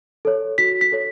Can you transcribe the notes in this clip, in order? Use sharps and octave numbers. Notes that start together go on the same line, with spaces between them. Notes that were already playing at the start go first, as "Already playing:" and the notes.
A4 C#5
F#4 B6
B6
A4 C#5